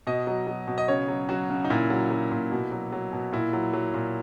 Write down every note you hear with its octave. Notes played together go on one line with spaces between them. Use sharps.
B2 D#5
F#3
F#3
B2
D#5
C#3 C#5
F#3
F#3 F#4
C#3
D#4
A#2 E4
F#3
F#3
A#2
B2
F#3
F#3
B2
A#2 E4
F#3
F#3
A#2